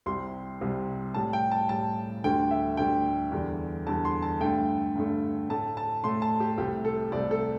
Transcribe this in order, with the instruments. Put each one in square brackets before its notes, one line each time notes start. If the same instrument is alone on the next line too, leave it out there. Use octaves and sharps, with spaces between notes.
[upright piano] C2 C3 G3 C6
C2 C3 G3
A2 G3 A5
G5
A5
A2 G3 A5
D2 D3 G3 G5
E5
D2 D3 G3 G5
E2 D3 G3
E2 D3 G3 A5
C6
A5
G2 D3 A3 G5
G2 D3 A3
A2 A3 A5
A5
A2 A3 C6
A5
G4
C2 C3 A3 G4
A4
C2 C3 A3 D5
A4